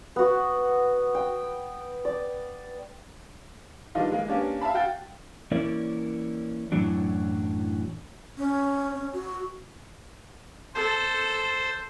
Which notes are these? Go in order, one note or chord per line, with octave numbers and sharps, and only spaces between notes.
B3 F#4
G5
D5
D#3 G3 B3 D4 D#4 F4
E3 G#3 A#3
A#3 B3 C#4 D4 G4
E5 F5 A5 B5
F#4 F5 G5 A6
E3 A#3 C#4 E4 A#4 D5
F#2 A2 E3 F#3 D4
C#4
C#4
F#4
A4 C5